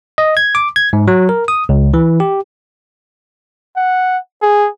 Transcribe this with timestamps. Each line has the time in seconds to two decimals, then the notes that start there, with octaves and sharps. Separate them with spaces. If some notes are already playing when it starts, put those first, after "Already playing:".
0.18 D#5
0.37 G#6
0.55 D6
0.76 G#6
0.93 G#2
1.08 F#3
1.29 A#4
1.48 D#6
1.69 C#2
1.94 E3
2.20 G4
3.76 F#5
4.42 G#4